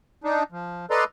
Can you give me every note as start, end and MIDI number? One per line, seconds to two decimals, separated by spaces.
0.24 0.43 62
0.24 0.43 63
0.52 0.86 53
0.91 1.04 69
0.91 1.04 71
0.91 1.04 74
0.91 1.04 75
0.91 1.04 82
0.91 1.04 84